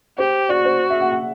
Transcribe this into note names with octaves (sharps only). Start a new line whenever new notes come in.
G4 C5
F#4 D5
C5
E5
F#5
F#5